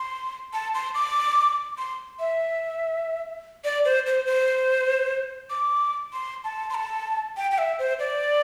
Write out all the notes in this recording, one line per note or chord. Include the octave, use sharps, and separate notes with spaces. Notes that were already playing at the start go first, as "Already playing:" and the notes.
Already playing: C6
A5
C6
D6
C6
E5
D5
C5
C5
C5
D6
C6
A5
C6
A5
G5
G5
E5
C5
D5